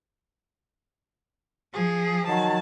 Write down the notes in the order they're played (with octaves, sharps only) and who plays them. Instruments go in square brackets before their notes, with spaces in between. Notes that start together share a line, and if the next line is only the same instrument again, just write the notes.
[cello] F3 [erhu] G#4
[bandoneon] D#3 F#3 [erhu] A5